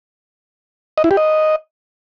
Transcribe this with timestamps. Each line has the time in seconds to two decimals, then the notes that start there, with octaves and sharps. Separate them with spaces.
0.98 D#5
1.04 E4
1.11 G4
1.17 D#5